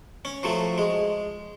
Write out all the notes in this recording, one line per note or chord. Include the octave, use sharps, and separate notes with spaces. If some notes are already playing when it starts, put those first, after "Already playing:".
C#4
F3 F#3 A3
G#3